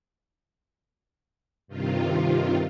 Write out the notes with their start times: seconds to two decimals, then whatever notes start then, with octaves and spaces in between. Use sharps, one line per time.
1.67 G2 C3 D#3 F4